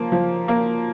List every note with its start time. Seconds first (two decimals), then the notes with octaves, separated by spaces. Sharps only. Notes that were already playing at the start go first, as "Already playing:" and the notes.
Already playing: F3 A#3
0.12 F3
0.48 A#3